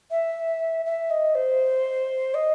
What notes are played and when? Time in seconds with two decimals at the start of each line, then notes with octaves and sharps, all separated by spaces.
0.10 E5
0.85 E5
1.10 D#5
1.34 C5
2.34 D#5